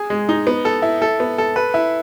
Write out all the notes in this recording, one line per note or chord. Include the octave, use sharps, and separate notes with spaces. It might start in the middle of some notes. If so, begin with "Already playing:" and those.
Already playing: G#4
G#3
D#4
B3
A4
E4
A4
B3
A4
B4
E4